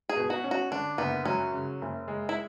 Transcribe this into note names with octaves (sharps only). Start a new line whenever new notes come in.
G#4
B2
F#4
C#4
F#4
D3 D4
F#1 B3
F#3 C#4
C#3
F#1
G#3
E4